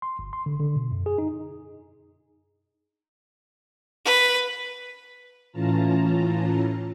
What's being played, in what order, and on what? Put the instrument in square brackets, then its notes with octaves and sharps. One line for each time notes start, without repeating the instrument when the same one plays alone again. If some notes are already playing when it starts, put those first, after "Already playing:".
[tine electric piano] C6
G1
C6
D3
D3
B2
F#2
G#4
D#4
[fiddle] B4
[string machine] A2 E3 C#4 F4 A5 A#5